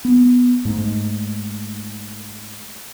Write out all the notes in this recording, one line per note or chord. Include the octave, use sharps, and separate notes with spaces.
B3
G#2 A3